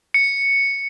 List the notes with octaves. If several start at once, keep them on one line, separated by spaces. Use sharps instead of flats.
C#7